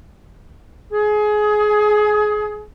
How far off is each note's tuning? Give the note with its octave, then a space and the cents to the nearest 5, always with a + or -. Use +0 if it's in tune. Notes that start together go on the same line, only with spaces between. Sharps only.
G#4 +20